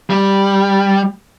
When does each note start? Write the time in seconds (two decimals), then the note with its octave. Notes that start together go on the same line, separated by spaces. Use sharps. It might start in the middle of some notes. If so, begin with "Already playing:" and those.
0.10 G3